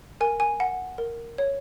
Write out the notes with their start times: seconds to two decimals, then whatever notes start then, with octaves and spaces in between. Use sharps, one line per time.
0.21 A#4 G#5
0.40 G#5
0.60 F#5
0.98 A#4
1.38 C#5